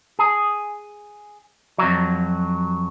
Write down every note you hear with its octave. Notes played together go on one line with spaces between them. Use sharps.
G#4
F2 F#3